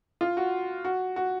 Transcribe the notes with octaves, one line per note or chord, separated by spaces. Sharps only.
F4
F#4
F#4
F#4